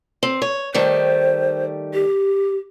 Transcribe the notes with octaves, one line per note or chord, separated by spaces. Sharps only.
C4
C#5
D#3 G3 A3 C5
G4